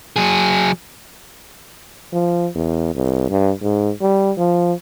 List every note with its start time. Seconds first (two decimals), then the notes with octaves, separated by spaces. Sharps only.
0.16 F#3 G#4
2.13 F3
2.55 E2
2.95 C2
3.30 G2
3.62 G#2
4.01 G3
4.38 F3